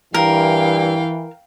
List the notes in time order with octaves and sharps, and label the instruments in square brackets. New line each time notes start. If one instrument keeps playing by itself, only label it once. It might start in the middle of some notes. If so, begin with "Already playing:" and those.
[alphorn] G2 [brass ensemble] E3 [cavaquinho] A#4 [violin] F5 G5